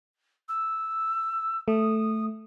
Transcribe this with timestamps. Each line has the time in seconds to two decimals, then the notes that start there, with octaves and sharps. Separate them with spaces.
0.48 E6
1.68 A3 D#6